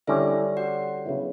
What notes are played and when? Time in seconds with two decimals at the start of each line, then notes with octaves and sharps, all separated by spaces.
0.07 D3 G3 C#4 E4 G4 E5
0.57 F#4 F#5
1.06 C#3 F#3 B3 E4